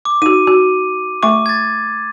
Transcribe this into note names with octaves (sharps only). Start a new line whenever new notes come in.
D6
D#4 F#4 D#7
F#4
A3 E5 C#6 D6
G#6 A6